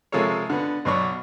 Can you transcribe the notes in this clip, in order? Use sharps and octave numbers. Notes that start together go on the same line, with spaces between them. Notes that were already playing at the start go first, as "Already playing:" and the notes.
C3 F3 G#3 A4 A#4 C#5
D3 B3
B1 B2 F#3 D5 C#6